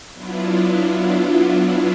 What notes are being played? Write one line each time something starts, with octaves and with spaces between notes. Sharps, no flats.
F#3 B3 D4 E4 F4